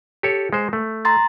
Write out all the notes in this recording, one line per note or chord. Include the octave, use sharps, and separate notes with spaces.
G4 A4 C#5
G#3 C5
A3
A#5 C6 A6